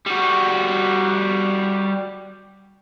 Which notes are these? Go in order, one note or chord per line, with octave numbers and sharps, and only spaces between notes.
G3 F#4